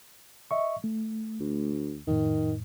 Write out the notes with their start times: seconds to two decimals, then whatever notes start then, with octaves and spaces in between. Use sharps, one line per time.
0.51 D#5 E5 C#6
0.84 A3
1.40 D2
2.07 F2 A2 D#3